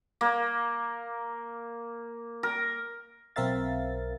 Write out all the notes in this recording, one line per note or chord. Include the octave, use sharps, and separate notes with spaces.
A#3
A#4
B1 C4 A#4 E5 F5 A6